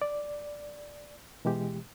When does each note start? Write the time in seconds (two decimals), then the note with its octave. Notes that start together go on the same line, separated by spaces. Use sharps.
0.02 D5
1.45 B2 E3 G#3 G4